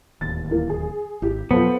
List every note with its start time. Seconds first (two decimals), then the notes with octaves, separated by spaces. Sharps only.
0.21 D1 D#2 A6
0.51 E3 A#3
0.70 G#4
1.22 G#1 E4 G4
1.51 F2 B2 F#3 B3 F4 A4 C5